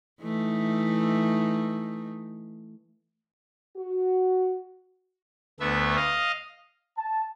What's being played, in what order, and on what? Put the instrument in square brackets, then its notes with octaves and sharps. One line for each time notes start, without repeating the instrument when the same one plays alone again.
[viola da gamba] E3 A3 D#4
[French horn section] F#4
[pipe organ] D2 A3 B3 E5
D#5 F5
[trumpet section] A5